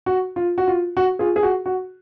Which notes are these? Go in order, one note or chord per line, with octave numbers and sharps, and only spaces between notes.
F#4
F4
F#4
F4
F#4
F4 G#4
G#4
F#4
F#4